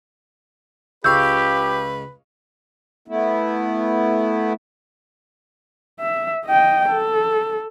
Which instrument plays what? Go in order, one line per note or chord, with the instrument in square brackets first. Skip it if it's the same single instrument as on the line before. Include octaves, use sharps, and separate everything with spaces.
[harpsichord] C#2 F5 [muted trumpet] G4 [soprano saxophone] B4 [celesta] C#6 E6 G6
[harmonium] A3 B3 E4
[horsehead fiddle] E5
D#5 G5
A4